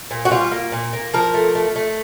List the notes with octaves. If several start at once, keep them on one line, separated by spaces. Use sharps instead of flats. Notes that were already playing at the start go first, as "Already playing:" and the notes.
A#2
F#4
G3 F4
A#3
A#2
A#3
F3 A#4
A3
A3
A3